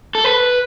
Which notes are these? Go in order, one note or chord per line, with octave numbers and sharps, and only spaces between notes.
A4
B4